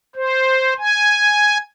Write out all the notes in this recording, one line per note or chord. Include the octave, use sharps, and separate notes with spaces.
C5
G#5